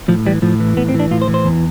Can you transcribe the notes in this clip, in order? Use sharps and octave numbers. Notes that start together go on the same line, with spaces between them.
A2 F3
E3 G3
A2 F3
E3
A2 B3
C4
E3
D4
A2 F4
C5
E3
C5
E2